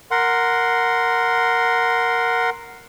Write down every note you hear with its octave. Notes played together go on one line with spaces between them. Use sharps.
A#4 F#5 C6